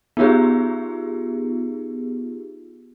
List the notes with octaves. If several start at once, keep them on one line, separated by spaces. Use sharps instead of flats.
B3 D#4 F4 G4 G#4